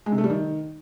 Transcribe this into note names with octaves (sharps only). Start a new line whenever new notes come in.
G#3
C3
A3
G3
D#3